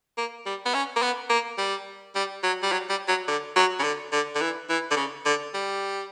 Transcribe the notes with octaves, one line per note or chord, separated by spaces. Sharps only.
A#3
G3
B3
C#4
A#3
B3
A#3
G3
G3
F#3
G3
F#3
G3
F#3
D3
F#3
C#3
D3
D3
D3
E3
E3
D3
C#3
D3
G3